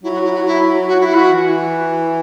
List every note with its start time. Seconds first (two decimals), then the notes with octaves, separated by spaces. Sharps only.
0.03 F#3 E4
0.14 F#4
0.25 E4
0.35 F#4
0.46 E4
0.88 F#4
1.00 E4
1.14 F#4
1.30 E3